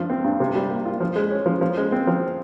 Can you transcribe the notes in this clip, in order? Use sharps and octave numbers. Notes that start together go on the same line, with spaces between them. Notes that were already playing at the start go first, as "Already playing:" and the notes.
Already playing: G2 F3
C4
G2
C3
G3
A#3
F4
F3
G#3
C#4
F3
F3
G#3
C4
F3